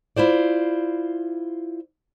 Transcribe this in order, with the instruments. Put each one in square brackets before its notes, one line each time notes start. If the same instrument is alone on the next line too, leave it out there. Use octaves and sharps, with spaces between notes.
[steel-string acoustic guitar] E4 F4 C5 D5